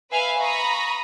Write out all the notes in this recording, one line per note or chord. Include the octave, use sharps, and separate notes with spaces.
B4 E5 F5 G#5
A#5 B5 C#6 D#6 A#6